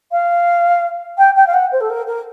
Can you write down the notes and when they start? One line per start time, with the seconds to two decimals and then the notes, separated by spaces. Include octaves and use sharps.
0.11 F5
1.18 G5
1.36 G5
1.46 F5
1.53 F#5
1.72 C5
1.80 A4
1.89 A#4
2.07 A#4